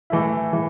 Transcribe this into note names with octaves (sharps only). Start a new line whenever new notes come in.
E3 A3 E4
E3